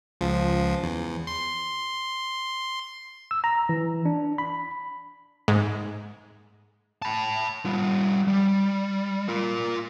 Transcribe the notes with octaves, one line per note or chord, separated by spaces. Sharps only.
C#2 F3
E2
C6
E6
A#5
E3
D4
B5
G#2
A5 B5
G3 F4
G3
F4 A#4